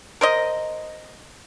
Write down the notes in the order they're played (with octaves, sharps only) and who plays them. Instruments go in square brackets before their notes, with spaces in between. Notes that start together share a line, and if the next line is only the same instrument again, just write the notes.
[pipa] A#4 C5 D#5